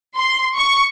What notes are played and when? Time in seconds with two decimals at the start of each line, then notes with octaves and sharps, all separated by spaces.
0.16 C6
0.58 C#6